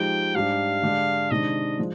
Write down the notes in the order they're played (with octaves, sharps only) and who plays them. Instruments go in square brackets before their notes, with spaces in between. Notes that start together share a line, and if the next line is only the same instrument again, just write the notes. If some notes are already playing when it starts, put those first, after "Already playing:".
Already playing: [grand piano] F3 G#3 D#4 G4 [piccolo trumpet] G5
[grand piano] G#2 G3 D4 G4 [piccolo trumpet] F5
[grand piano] D3 G#3 D4 G4
[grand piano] C3 D#3 G#3 D4 [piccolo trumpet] D#5
[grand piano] F3 G#3